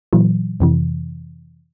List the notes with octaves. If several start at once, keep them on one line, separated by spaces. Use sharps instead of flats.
A#2 E3 F#3
F2 C3 E3